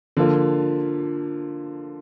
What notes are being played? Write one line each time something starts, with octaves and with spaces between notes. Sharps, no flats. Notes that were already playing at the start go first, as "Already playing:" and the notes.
D3 F3 A#3 F4